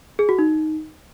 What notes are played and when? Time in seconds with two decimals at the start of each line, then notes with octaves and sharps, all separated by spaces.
0.19 G#4
0.29 F#4
0.39 D#4